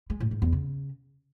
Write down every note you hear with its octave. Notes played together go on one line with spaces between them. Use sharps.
G#3
A2
G#2
E2
C#3